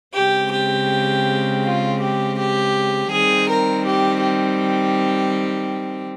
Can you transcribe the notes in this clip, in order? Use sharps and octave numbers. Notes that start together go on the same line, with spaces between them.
C#3 G#3 C4 G4
G4
F4
G4
G4
D#3 G3 C4 G#4
A#4
G4
G4